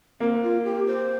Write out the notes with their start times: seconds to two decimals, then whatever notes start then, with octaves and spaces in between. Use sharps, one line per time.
0.20 A#3 C4
0.42 F4
0.64 G4
0.86 C5